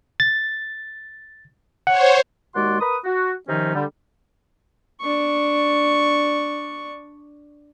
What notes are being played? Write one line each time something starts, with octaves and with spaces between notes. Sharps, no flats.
A6
C5 C#5 F#5
D#2 G#3 F#4 D5 F#5 C6
A#4 B4 B5 D#6
F#4
C3 D#3 F3 C4 C#4 D#4
D3 G3
D4 C#6